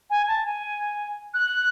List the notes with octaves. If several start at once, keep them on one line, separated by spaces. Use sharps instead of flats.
G#5
A5
G#5
F#6